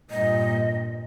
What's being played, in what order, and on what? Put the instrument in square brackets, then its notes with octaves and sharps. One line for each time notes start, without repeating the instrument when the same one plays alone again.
[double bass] G2 A#2 [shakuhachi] D#5